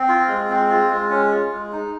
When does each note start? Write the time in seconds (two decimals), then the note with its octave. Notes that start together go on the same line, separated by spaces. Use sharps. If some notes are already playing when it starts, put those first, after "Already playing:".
Already playing: C4
0.09 F4
0.28 G#3
0.49 C4
0.70 F4
0.90 G#3
1.10 C#4
1.32 F4
1.52 G#3
1.72 D#4